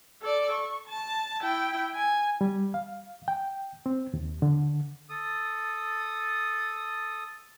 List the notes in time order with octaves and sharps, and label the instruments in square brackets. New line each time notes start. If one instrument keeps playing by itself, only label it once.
[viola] A4 D5
C#6
A5
E4 G5
G#5
[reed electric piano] G3
F5
G5
C4
D#2
D3
[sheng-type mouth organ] A4 D#6